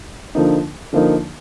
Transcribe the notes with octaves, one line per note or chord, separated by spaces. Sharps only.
D3 F3 A#3 D#4
D3 F3 A#3 D#4